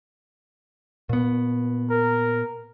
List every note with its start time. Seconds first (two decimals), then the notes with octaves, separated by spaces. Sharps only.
1.09 A#2 B3
1.90 A#4